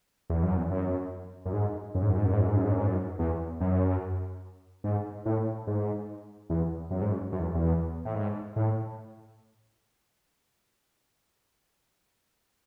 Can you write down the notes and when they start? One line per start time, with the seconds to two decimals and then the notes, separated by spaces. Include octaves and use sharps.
0.30 E2
0.43 F#2
0.57 E2
0.71 F#2
1.45 F#2
1.53 G#2
1.95 F#2
2.03 G#2
2.10 F#2
2.18 G#2
2.25 F#2
2.33 G#2
2.41 F#2
2.48 G#2
2.56 F#2
2.64 G#2
2.72 F#2
2.79 G#2
2.87 F#2
3.19 E2
3.60 F#2
4.84 G#2
5.26 A2
5.67 G#2
6.50 E2
6.91 F#2
7.02 G#2
7.11 F#2
7.32 F#2
7.40 E2
7.55 E2
8.05 A2
8.15 G#2
8.56 A2